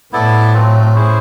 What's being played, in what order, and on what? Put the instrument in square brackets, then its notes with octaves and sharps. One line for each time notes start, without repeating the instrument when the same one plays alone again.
[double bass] A2 [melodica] B3 E4 A4 D5
[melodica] F#3 A3 C4 F4
C#4 E4 G#4 C5